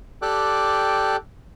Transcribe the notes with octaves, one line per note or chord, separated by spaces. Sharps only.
G4 A4 D5 G5 D6 F#6